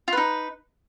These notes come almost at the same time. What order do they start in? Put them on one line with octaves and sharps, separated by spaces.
F4 B4 D#4